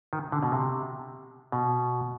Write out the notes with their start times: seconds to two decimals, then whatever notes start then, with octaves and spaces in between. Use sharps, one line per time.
0.13 D#3
0.32 D3
0.43 B2
0.52 C3
1.52 B2